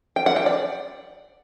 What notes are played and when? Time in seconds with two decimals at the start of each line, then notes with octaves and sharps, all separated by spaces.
0.16 G5
0.26 F#5
0.36 G5
0.46 D5